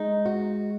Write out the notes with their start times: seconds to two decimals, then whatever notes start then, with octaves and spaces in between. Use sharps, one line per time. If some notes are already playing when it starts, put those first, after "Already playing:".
Already playing: G#3 D#4
0.25 F#4